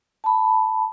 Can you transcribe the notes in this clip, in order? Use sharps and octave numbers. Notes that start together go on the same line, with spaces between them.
A5 B5